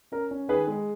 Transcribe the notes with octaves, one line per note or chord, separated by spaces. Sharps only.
C#4 A#4
C#4
D#3 G#4 B4
G#3